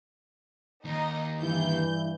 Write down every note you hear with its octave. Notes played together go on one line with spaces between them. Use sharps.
D#2 D#4 D#5
G2 E3 E4 G6